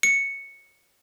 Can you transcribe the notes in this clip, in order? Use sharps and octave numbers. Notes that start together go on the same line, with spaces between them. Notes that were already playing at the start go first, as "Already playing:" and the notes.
C#7